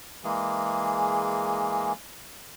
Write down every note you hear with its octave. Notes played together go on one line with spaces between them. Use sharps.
E3 G#3 A#3 G#4